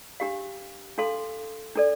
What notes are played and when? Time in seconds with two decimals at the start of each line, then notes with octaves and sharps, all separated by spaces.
0.20 D4 G4 F5
0.98 D4 A4 F5 C6
1.76 D4 A4 D5